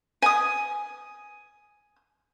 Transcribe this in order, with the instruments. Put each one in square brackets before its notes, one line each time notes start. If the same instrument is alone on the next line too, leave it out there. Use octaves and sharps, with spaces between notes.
[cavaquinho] G#5 D#6